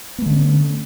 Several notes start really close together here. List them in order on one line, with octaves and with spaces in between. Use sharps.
B3 A3 D3 C#4